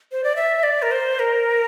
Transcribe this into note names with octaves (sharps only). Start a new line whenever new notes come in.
C5
D5
E5
D5
A#4
C5
A#4